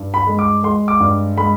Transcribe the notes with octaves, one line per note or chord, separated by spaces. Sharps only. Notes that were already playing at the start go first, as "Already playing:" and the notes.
Already playing: G2
B5
G#3
D6
G#3 C6
D6
G2
G#3 B5